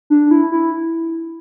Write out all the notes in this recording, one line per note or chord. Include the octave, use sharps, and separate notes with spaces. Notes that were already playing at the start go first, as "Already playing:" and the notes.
D4
E4
E4